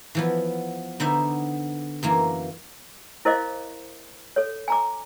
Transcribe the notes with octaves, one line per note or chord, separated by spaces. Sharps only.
E3 F3 B3
D3 B3 D#4 C5 E5
F#2 E3 A#3
E4 A#4 C5 D#5 F5 D6
A4 C#5
G#5 A#5 D6